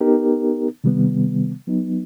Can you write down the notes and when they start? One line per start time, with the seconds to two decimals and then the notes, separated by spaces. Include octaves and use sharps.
0.01 B3 D#4 G4 A#4
0.84 C3 D#3 G3 B3
1.67 F#3 B3 D#4